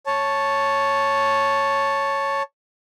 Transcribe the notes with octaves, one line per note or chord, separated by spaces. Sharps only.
C#5 A5